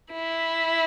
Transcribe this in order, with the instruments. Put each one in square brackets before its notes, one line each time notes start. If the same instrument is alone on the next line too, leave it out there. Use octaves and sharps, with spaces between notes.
[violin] E4